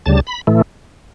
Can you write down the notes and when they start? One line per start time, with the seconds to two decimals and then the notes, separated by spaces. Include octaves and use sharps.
0.06 D2 C#3 G3 A5
0.27 B5
0.47 A2 E3 A3